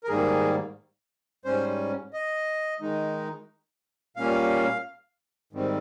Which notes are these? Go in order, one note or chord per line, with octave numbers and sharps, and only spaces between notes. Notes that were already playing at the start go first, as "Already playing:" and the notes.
A#4
G#2 D#3 G3 A#3 G#4
G#2 G3 C#4 C5
D#5
D#3 G#3 D#4
A#2 G3 A#3 C#4 F5
G#2 D#3 G3 C4